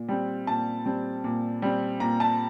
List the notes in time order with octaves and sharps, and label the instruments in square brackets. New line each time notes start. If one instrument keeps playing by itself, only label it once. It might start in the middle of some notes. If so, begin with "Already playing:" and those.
Already playing: [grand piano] A#2
G3 C4
A#2 A5
G3 C4
A#2
G3 C4
A#2 A#5
A5